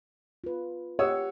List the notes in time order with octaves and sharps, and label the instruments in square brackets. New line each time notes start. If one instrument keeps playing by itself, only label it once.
[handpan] F4 B4
[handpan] G4 F#5 [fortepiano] C#5 D#6 E6